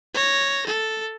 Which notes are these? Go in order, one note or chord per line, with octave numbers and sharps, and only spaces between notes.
C#5 A#6
A4